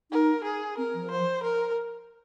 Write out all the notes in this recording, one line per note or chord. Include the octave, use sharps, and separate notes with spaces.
D#4 A#4
G#4
C4 A#4
F3
C5
A#4